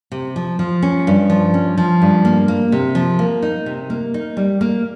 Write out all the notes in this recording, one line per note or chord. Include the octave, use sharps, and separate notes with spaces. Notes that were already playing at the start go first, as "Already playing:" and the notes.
C3
F3
F3
C#4
G2
F3
C#4
F3
G2
A#3
A#3
C3
F3
A#3
D#4
C3
A#3
D#4
G3
A#3